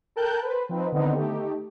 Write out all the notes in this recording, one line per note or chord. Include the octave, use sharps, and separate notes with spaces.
A4 A#4 G5 A5 F#6 G6
B4 C5
F3 C4 D#4 B4
D3 D#3 B3 C4 D#4
A3 D#4 G4